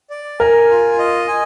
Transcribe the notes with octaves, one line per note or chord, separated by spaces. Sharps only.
D5
A#4 G#5
F4
D#5
G#5